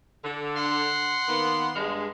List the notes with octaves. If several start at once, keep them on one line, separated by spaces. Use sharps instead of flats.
D3
F#5 C6
D#3 A#3 B3
G2 G#3